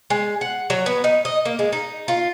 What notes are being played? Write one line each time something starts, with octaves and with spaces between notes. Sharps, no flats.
G#3
F#5
F#3
B3
D#4
D#5
A#3
G#3
D#4
F4